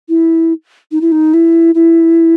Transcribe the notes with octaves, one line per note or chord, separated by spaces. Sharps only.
E4
D#4
E4
D#4
E4
E4